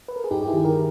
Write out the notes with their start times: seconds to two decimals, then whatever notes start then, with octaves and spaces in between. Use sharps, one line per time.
0.08 B4
0.16 A#4
0.24 G#4
0.31 G2 D#4 G4
0.43 G4
0.48 E4 G#4
0.54 D#3
0.65 G4 A#4